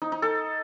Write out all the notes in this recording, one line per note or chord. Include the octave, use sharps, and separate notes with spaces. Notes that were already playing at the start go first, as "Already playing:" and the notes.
D#4
D#4
A4